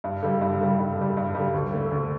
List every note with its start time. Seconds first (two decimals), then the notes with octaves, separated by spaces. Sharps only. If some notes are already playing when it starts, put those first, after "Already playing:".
0.04 G2
0.23 D3 G3
0.41 G2
0.60 D3 G3
0.79 G2
0.98 D3 G3
1.17 G2
1.35 D3 G3
1.54 D2
1.73 D3 A3
1.91 D2